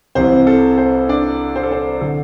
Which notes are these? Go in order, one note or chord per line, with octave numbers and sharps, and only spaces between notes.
C2 C3 E3 C5
A4
C5
D4 D5
C5
A4
C5
D3 A4